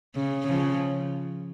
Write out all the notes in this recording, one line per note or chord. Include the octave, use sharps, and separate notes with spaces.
C#3
C#3 F3